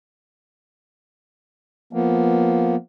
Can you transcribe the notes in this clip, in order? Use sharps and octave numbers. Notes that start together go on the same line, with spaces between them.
F3 A#3 B3